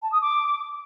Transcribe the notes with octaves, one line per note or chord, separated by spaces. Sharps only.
A5
D#6
D6